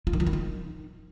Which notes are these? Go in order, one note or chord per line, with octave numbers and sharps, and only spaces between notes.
F4
D#3
F3
D#3
D#4